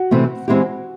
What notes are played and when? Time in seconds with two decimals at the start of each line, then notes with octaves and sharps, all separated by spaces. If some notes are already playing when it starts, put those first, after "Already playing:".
Already playing: F#4
0.11 C3 E3 A3 C4
0.48 E3 G#3 C4 E4 G4